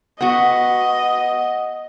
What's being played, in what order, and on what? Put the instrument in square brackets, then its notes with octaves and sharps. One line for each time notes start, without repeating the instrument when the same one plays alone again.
[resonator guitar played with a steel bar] B3 F#4 [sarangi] D#5 [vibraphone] F#5